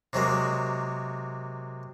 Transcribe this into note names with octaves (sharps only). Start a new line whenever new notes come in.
C3 F#3 G#3 A#3